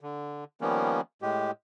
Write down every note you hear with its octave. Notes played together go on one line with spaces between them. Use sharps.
D3
D#3 F3 G3 A#3 B3 C#4
A2 G#3 G4